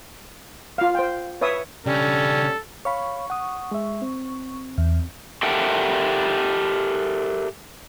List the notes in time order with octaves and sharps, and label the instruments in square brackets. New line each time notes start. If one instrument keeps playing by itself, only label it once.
[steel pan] F4 F5
C5 G5
B4 C#5 E5 D#6
[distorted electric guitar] C#3 D4 [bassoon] G3 [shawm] C#4 [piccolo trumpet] A4
[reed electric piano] C#5 F5 B5 [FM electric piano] C#6
[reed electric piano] F#5 D#6
G#3 E5
C4
[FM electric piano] E2
[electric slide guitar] G4 A4 A#4 E5 F#5 G5